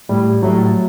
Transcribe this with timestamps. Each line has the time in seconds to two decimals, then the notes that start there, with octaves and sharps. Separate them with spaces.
0.09 A2 G3
0.42 A2 F#3